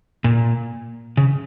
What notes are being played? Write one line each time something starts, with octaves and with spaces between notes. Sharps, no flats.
A#2
C#3